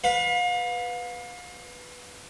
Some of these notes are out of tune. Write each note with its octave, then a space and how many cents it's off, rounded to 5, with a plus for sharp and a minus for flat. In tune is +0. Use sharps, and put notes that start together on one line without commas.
B4 +0 F5 +35